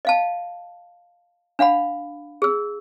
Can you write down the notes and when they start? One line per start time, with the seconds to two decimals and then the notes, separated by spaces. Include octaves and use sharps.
0.05 D#5 F5 A5
1.59 D4 F5 F#5 B5
2.42 G#4 E6